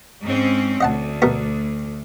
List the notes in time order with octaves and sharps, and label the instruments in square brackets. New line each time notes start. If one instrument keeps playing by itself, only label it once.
[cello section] G#2 C4 C#4
[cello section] D2 [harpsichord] D#5 F#5 A5
[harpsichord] B2 A3 A#4